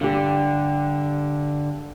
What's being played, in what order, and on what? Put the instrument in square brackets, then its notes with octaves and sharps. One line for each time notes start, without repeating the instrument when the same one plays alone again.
[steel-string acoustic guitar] G2 G4 [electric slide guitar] D3